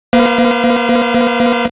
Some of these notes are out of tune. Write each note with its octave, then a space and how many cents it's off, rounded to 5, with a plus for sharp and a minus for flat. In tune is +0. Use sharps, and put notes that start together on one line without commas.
A#3 +30 B4 +45 F5 -20